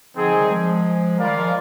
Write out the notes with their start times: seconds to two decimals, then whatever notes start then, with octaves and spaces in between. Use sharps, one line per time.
0.15 D3 F3 C4 D#4 G#4
0.32 D#3 G3
0.50 F3 G#3
1.18 D#3 G3 F4 A#4 D5 F5
1.35 F3 G#3